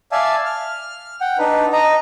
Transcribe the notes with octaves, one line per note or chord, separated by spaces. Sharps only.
D5 E5 F5 G#5 A5
F6
F#5 G5
D4 D#4 B4
D#5 A#5